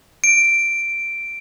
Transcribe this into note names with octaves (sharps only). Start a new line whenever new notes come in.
D7